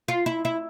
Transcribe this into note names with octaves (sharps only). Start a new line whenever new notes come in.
F4
E4
E4